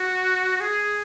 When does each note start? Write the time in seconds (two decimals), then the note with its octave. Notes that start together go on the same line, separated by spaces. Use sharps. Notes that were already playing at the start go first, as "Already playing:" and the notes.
Already playing: F#4
0.60 G#4